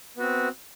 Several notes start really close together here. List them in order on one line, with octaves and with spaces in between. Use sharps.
B3 F#4 C4